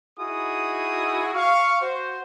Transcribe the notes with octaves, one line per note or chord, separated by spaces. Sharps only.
D#4 E4 F#4 G#4 D#6
F5 C#6
F#4 C5